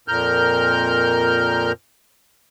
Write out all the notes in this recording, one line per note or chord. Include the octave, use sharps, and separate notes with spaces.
F2 A#2 A#4 F6 G6